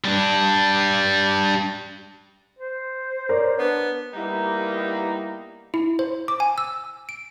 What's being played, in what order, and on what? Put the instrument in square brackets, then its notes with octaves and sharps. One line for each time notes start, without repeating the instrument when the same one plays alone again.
[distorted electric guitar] G3 D4
[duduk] C5
[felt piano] A#4 C#5 D5
[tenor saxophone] B3 [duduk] D4
[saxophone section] G3 B3 E4 [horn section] A#3 D#4 G4
[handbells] E4
C5
D6
G#5
E6
D7